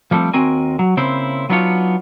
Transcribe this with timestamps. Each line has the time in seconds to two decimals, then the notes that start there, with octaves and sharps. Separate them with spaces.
0.11 F3 G3 A3 C4
0.33 D#2 C4 F#4 A#4 G#5
0.79 F#3
0.97 C#3 A#3 C4 E4 C5
1.50 F#3 B3 D4 D#4 F4 C#5